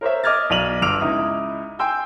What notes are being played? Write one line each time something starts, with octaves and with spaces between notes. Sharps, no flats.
A#4 C5 C#5 E5
D#5 D6 D#6 F6 G#6 A6
B1 D5 D#7 F7 F#7
G1 D6 E6 F6 D7 F7
C#2 D#4 E4 D#6
G5 G#5 C6 E6 G6